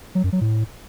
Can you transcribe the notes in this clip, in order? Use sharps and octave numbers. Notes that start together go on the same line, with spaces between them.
F#3
F#2
F#3
A2